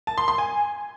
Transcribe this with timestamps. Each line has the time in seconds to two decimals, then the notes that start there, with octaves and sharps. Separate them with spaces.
0.07 A5
0.18 C6
0.28 C6
0.38 G#5